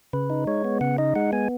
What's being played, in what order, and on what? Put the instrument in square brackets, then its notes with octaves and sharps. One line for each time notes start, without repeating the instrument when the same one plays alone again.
[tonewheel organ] C#3 B4
D#4
G#3 C#5
B3
C#3 F#5
D#4 D#5
G#3 F#5
B3 G#5